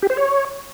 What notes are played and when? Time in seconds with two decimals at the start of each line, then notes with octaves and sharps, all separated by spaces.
0.02 G4
0.10 C5
0.17 C#5